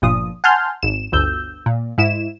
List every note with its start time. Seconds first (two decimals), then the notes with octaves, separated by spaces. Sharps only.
0.02 G1 A#2 F3 D#6
0.44 F#5 G#5 A5 C6 F6 G6
0.83 G#1 E7
1.12 G1 D2 E6 G6
1.66 A#2
1.98 G#2 E4 E7